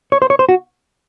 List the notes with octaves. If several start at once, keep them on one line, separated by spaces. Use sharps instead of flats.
C#5
C5
C#5
C5
F#4